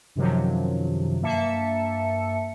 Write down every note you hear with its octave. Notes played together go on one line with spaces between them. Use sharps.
F#2 C3 D#3 F3 F#3
G2 A#3 E5 A5 C#7